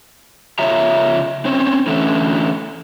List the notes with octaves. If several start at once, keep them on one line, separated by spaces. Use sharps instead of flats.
C#3 F4 C#5 E5 A#5
C4 C#4 C5
D3 E3 A3 C#4